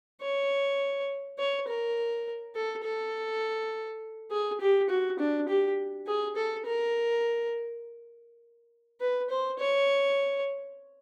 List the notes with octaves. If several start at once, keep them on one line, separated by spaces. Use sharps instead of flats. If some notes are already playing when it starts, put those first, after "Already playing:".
C#5
C#5
A#4
A4
A4
G#4
G4
F#4
D4
G4
G#4
A4
A#4
B4
C5
C#5